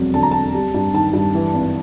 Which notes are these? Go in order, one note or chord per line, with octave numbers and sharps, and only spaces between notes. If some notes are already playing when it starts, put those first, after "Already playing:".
Already playing: E1 F2 F#3
D3 A5
A#5
F2 A5
G3
G2
D#3 A5
G2
E3
G#1